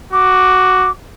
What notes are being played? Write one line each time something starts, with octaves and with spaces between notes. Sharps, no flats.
F#4 D6